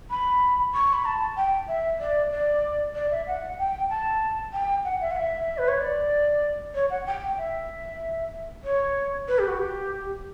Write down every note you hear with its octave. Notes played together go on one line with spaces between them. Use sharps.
B5
C#6
B5
A5
G5
E5
D5
D5
D5
E5
F#5
G5
A5
G5
F#5
E5
F#5
E5
B4
C#5
D5
C#5
F#5
G5
E5
C#5
B4
G4
F#4
G4